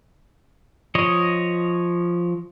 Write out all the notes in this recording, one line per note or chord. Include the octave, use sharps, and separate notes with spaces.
F3 C#5 D#5